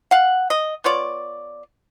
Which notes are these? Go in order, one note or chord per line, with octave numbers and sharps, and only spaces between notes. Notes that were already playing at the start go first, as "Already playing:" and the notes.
F5 F#5
D#5
B3 F4 C#5 D5